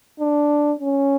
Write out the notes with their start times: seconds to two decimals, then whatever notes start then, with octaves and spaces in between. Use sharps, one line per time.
0.20 D4
0.79 C#4